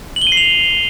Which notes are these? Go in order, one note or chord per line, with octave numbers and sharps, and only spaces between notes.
F#7
G7
D#7
C7
F7